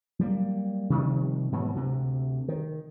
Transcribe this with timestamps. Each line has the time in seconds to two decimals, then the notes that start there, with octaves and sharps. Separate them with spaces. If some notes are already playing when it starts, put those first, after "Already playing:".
0.19 F#3 G3 A#3
0.90 C3 D#3 F3 G3
1.52 G#2 B2 E3 F#3
1.76 D2 C3
2.48 D#3